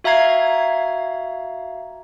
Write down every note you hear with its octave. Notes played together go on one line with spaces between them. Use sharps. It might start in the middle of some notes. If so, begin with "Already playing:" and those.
F#4 E5 F5 A#5 G#6 C7